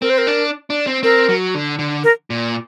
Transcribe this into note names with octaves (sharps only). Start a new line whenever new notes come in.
C4 A#4
C5
A#4
D4
D4
C4
C4 A#4
F#3
D3
D3
A#4
A#2